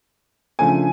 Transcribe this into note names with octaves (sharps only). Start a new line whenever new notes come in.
C#3 F3 A3 D4 G#5